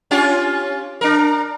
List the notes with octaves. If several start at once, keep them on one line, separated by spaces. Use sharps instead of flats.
C#4 F4 G4
D4 A#4